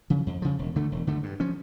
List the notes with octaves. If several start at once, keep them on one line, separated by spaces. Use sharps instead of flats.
C#3 F3
F2
C#3 F3
E1
D2 D3 A3
E1
D2 D3 A3
G2
F3 C#4